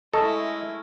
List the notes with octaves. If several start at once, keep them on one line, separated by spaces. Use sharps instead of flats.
G#3 A3 C#4 E4 A4 D#5